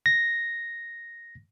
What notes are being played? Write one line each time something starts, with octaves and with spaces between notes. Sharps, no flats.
A#6